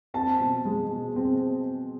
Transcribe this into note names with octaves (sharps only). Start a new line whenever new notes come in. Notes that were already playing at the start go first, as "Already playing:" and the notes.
C4 A5
B2
G#3
B2
C4